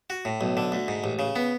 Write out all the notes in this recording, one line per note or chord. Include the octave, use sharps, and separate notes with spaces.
F#4
A2
B1
D3
D2
G#2
A1
C#3
B3